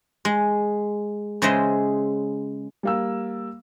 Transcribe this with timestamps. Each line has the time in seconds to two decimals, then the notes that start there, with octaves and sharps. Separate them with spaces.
0.25 G#3
1.42 C#3 G#3 C5 D#5 E5
2.83 G3 A#3 E6